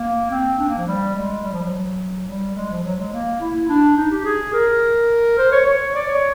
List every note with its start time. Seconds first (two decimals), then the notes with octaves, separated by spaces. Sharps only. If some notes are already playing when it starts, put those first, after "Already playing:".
Already playing: A#3
0.31 C4
0.59 D4
0.68 A#3
0.78 F3
0.87 G3
1.15 G#3
1.44 G3
1.52 F3
1.63 F#3
2.28 G3
2.56 G#3
2.70 F3
2.84 F#3
2.99 G#3
3.13 A#3
3.41 E4
3.69 D4
3.97 D#4
4.11 G4
4.25 G#4
4.54 A#4
5.38 C5
5.52 C#5
5.66 C#5
5.95 D5
6.08 C#5